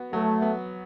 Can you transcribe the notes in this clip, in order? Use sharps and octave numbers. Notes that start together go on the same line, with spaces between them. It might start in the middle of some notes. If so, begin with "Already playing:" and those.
Already playing: B3 F#4
F#3 A3
B3